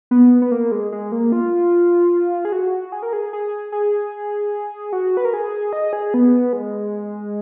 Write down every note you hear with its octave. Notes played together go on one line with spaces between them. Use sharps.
B3
B3
A#3
G#3
G#3
A#3
F4
G#4
F#4
G#4
A#4
G#4
G#4
G#4
F#4
B4
A#4
G#4
D#5
G#4
B3
G#3